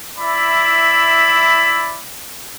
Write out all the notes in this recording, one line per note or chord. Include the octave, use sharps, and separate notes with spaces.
E4 D5 E5 B5